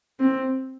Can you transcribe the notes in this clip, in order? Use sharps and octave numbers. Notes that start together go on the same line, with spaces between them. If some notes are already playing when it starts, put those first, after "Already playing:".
C4